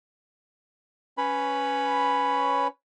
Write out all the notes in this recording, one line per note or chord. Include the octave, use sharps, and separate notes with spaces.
C#4 B4 C#5 B5